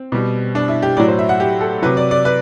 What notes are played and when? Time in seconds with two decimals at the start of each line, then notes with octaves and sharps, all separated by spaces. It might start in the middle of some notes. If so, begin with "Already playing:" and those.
Already playing: C4
0.12 B2 G3
0.55 D4
0.68 E4
0.82 G4
0.97 A2 D5
1.00 F#3
1.08 C5
1.19 E5
1.29 F#5
1.40 G4
1.61 A4
1.82 C3 F#3 B4
1.97 D5
2.11 D5
2.25 B4